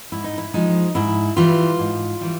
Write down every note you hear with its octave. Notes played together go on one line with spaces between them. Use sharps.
G#2 E4
D#4
E4
F3 G#3 D#4
G#2 E4
E3 G3 F4
G#2
E3 G3